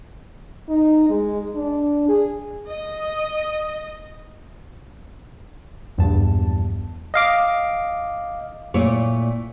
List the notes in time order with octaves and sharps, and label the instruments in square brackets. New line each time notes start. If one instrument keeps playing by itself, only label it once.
[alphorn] D#4
G#3
D4
G#4
[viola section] D#5
[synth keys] A#1 E2 G2 A5
[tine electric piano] D#5 F5 D6
[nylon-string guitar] A#2 A3 E4 C#5 D5